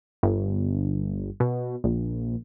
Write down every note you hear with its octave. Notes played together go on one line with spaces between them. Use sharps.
G1
B2
A#1